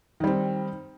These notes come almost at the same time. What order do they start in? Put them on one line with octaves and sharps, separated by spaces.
D#3 G3 C4